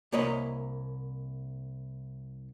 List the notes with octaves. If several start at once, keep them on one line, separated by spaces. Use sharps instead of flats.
C2 A#3 C#5 D#5 B5